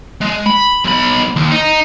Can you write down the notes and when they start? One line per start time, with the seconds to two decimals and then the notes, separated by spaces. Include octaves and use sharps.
0.21 G#3
0.46 B5
0.85 B1 B5
1.36 D#2
1.51 D#4